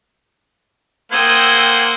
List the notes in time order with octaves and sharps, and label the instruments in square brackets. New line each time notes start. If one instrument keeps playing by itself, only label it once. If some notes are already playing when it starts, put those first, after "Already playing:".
[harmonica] A#3 C5 F#5 [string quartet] G5 D#6 E6 [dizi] G#6